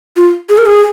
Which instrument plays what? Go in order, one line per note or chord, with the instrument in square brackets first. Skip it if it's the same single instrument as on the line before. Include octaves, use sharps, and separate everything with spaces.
[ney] F4
G#4
A#4
G#4